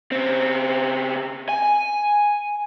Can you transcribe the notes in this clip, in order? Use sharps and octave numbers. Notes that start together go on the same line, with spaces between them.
C#3 C4
G#5